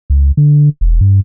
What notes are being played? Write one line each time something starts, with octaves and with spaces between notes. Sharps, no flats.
C#2
D3
E1
G2